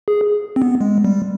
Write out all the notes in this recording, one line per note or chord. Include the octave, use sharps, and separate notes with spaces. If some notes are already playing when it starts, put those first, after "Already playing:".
G#4
C4
B3
G#3
G3